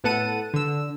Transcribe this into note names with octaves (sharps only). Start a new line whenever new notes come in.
A2 B3 A4 F#5 A5 D#7
D3 E6